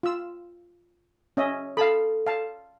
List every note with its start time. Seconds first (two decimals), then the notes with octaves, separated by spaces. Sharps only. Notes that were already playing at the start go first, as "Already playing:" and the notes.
0.03 F4 E6
1.37 C#4 D#5 E5
1.77 A4 F5 A5 B5
2.27 F5 A5